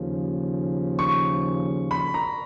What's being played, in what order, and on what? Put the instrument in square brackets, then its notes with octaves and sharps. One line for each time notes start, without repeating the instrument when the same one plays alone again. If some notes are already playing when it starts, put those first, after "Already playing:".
Already playing: [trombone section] D#2 C#3 F3
[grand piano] C#6
B5
A#5